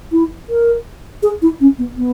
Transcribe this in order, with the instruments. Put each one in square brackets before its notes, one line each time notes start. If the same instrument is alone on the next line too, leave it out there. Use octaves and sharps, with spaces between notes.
[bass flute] E4
A#4
G#4
E4
C#4
B3
B3